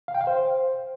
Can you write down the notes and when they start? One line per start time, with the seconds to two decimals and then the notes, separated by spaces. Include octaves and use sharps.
0.08 F5
0.14 G5
0.21 F5
0.27 C5